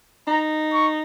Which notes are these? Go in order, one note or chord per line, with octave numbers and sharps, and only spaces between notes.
D#4 A#5
C#6